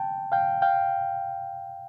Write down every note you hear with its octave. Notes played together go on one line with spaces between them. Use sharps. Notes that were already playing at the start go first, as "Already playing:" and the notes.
Already playing: G5 A5
F5 G5
F5 G5